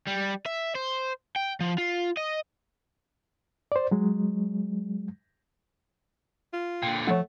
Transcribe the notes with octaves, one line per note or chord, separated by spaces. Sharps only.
G3
E5
C5
G5
F3
F4
D#5
C5 D5
F#3 G#3
F4
A#2 D3 G5
F3 A3 C#5 F#5